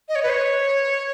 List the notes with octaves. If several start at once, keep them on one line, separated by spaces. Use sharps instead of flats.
D#5
C#5
B4
C#5